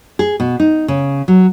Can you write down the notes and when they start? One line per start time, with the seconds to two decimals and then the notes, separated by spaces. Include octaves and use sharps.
0.19 G#4
0.40 B2
0.60 D#4
0.88 C#3
1.28 F#3